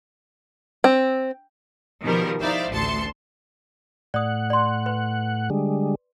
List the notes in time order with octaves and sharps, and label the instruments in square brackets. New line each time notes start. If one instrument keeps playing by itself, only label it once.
[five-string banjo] C4
[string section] B2 D#3 F3 G3 A#4
D#4 E4 C5 D5 E5 F5
A1 D2 A5 C6 C#7
[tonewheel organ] A2 F#5 [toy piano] D5 D#6
[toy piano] D5 C6
B4
[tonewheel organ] D3 G3 G#3